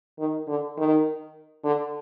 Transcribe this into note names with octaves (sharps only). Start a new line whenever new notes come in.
D#3
D3
D#3
D3